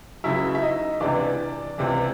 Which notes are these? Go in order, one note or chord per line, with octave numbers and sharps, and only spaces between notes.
C#2 C#3 F#3 E4 E5
E5
D#4 D#5
C#2 C3 E3 D4 D5
C#2 C3 E3